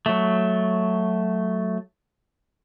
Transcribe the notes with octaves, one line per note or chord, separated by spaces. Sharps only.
F#3 A3